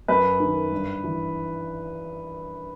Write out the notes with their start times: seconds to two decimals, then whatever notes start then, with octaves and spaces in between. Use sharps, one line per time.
0.08 F#2 B4
0.40 D#3
0.71 G2
1.04 E3